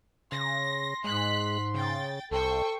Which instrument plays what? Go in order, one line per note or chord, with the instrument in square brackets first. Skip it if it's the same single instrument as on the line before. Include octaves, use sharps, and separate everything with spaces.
[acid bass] C#3 [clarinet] C6 [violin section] A#6
[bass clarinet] G#2 [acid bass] G#3 [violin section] F#6 B6
[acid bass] C#3 [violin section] G5 A6
[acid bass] C2 [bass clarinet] A4 [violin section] C5 G5 C#6